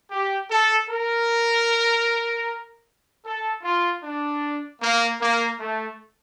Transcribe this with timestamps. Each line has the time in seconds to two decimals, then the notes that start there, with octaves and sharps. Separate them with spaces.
0.11 G4
0.50 A4
0.90 A#4
3.25 A4
3.63 F4
4.03 D4
4.81 A#3
5.20 A#3
5.59 A3